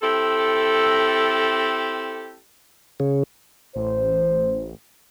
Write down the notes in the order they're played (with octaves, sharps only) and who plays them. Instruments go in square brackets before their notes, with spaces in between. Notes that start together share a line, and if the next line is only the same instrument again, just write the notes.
[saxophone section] C4 E4 G4 A4
[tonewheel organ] C#3
[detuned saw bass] A1 [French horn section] C5